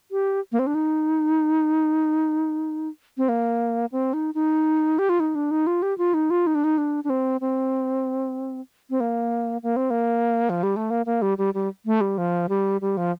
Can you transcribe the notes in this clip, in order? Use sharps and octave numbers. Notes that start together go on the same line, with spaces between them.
G4
A#3
C4
D4
D#4
C4
A#3
C4
D#4
D#4
G4
F4
D#4
D4
D#4
F4
G4
F4
D#4
F4
D#4
D4
D#4
D4
D4
C4
C4
C4
A#3
A#3
C4
A#3
F3
G3
A3
A#3
A#3
G3
G3
G3
A3
G3
F3
G3
G3
F3